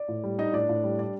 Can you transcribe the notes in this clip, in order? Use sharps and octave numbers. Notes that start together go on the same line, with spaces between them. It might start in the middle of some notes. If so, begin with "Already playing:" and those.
Already playing: D5
A2
G3
D4 D#4 D#5
A2 D4 D5
A2
G3
D4 D5